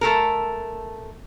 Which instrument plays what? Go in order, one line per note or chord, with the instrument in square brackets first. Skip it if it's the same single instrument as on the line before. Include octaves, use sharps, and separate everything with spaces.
[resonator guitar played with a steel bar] A3 A4 A#4